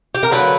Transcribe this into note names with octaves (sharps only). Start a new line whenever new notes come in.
G4
A#4
D3 F#3 A#3 B4